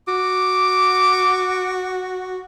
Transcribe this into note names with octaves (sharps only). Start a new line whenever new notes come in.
F#4 D6